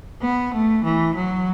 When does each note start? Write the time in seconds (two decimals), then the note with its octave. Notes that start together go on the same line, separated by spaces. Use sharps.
0.22 B3
0.54 A3
0.84 E3
1.15 F#3